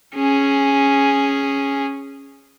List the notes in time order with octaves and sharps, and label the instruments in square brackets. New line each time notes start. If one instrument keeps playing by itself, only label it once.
[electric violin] C#4 G#4